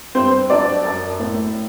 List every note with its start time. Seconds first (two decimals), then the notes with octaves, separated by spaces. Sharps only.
0.15 G2 C4 C5
0.50 F#3 D4 D5
0.85 F#2
1.20 A2